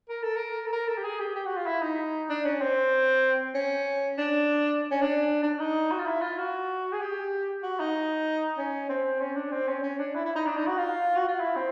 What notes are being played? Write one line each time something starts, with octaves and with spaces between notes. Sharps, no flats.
A#4
A4
A#4
A4
A#4
A4
G4
G#4
G4
G4
F#4
F4
E4
D#4
D4
C#4
C4
C#4
D4
C#4
D4
D4
D#4
F#4
F4
E4
F4
F#4
G#4
G4
F#4
D#4
C#4
C4
C#4
D4
C4
C#4
C#4
D4
E4
E4
D#4
D4
D#4
F#4
F4
F#4
F4
E4
C4